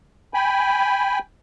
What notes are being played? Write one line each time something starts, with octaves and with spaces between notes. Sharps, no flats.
G5 G#5 B5